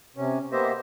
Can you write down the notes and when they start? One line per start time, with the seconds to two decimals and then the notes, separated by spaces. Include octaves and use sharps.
0.16 C3 C#4
0.52 A#3 B3 G4 C5 D#5 E5